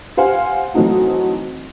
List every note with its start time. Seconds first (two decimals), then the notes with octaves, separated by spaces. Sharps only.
0.17 G4 C5 F5 F#5 G#5
0.74 E3 F#3 A3 C4 D#4 F#4